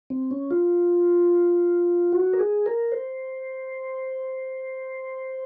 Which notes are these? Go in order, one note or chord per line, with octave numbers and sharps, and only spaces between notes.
C4
C#4
F4
F#4
A#4
G#4
A#4
C5